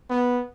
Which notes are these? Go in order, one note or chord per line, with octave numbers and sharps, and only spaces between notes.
B3